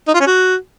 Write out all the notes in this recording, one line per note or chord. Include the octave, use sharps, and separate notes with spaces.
D#4
F4
C#4
F#4